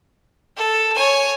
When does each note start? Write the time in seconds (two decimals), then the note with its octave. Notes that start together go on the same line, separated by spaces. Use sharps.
0.57 A4
0.95 C#5 G#5